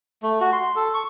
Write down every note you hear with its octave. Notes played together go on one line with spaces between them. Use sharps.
A3
F#4
C6
A4
C#6